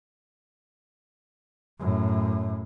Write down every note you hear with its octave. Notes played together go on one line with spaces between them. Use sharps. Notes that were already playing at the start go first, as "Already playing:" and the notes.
F#2 A2